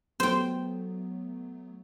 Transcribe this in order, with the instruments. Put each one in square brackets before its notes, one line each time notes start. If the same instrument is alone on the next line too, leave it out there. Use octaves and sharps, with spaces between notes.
[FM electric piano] F#3 A3 B3 [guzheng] C5 G5